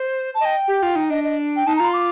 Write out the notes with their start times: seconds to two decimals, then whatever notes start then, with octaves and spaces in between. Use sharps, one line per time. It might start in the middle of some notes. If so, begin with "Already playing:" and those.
Already playing: C5
0.35 A5
0.41 D#5 G5
0.68 G4
0.83 F4
0.96 D#4
1.10 D4 D#5
1.24 D#5
1.56 G5
1.66 D#4 A5
1.76 A#5
1.80 F4 C6
1.94 D6